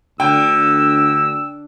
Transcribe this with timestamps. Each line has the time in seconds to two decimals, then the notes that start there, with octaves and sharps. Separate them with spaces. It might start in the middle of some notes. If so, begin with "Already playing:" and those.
0.20 D2 D3 G5 E6